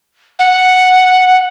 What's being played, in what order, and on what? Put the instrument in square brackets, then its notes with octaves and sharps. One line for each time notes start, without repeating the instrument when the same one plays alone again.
[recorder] F#5